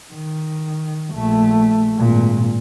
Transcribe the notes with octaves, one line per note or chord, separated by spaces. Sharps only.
D#3
A#1 A3
G#1 A#2